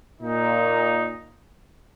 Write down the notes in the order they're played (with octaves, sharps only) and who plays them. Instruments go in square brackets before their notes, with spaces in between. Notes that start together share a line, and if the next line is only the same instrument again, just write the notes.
[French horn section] A#2 [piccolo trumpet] D#4